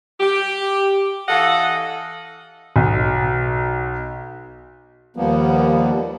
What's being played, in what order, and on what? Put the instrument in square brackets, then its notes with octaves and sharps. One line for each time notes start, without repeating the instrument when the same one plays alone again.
[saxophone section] G4
E3 A4 D#5 F5 F#5
[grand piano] B1
[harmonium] D#2 F3 G3 A#3 B3